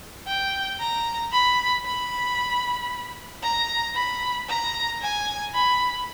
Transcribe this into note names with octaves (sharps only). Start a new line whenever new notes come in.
G5
A#5
B5
B5
A#5
B5
A#5
G#5
B5